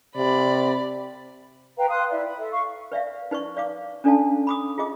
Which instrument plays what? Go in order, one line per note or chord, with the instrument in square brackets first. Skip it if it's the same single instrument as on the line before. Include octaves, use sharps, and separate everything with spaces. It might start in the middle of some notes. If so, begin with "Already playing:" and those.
[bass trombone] C3 [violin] D5 [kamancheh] B5
[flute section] B4 F5 G5 A#5
F5 C6 D#6 F#6
E4 D5 E5
B5
A4 E5
F5 C#6
[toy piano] B4 D5 E5 F5
D#4 B4 D5 C#6
D5 F5 D6
C#4 D4 A4 D5 F5 A5
B5 D6 D#6
F4 G#4 D#5 D6